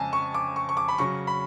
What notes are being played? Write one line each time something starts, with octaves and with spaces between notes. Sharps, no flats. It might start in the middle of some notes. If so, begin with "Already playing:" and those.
Already playing: F2 C#3 G#3 G#5 A5
C#6
D6
C#6
C#6
D6
B5
C#3 F#3 C#4 C#6
B5